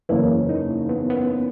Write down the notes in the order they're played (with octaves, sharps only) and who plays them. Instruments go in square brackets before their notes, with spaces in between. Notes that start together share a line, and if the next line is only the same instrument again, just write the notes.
[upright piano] F#1 E2 C#3 E3 A#3 [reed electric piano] E4
[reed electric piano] D#4
B3
B3
C#4